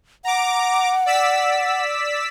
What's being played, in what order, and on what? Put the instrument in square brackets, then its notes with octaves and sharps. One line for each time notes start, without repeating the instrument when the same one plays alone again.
[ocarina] F#5 [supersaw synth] A#5 D6
[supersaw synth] D5 E6 B6